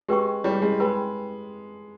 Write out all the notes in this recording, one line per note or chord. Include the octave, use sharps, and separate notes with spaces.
G#3 G4 B4 G5 C#6
G3 C#4 E4 G#4 C#5 G5
G#3
G#3 G4 B4 G5 B5